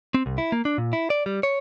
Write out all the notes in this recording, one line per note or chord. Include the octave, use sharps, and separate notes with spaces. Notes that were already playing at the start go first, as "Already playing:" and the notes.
C4
C2
E4
A#3
D4
A#2
E4
D5
G3
C#5